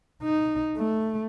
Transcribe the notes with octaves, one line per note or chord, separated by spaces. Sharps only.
D#4
A3